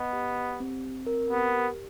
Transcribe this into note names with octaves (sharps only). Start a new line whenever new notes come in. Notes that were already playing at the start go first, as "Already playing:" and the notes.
Already playing: B3 D#5
G4
G4
C4
C4
A#4
B3 G4
G4